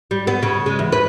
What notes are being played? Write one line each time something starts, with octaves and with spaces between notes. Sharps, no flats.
G3
B3
C#3
G#3
E2
B4